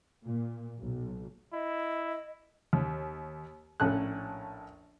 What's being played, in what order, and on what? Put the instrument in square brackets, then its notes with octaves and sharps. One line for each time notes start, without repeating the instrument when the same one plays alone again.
[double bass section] A#2
B1
[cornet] E4 [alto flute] D#5
[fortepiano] D#2
A#1 A2 C#4 F#6